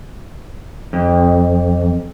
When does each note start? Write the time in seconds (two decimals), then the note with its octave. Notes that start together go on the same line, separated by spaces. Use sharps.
0.93 F2